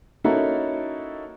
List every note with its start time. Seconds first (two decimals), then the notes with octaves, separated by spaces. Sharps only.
0.24 A#3 C#4 D#4 E4 F#4 A4